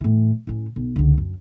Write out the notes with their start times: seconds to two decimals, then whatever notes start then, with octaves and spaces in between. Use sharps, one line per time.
0.01 A2 E3
0.47 A2 C#4
0.76 B1
0.96 C#2 D3
1.18 F#2